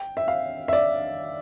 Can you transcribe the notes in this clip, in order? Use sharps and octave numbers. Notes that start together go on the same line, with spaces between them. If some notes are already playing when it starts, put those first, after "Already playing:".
Already playing: G5
E5
F5
E5
D5